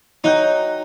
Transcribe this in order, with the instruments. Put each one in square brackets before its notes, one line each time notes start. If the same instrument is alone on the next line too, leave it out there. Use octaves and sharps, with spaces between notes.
[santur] F#3 F#5 G5 [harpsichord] D#4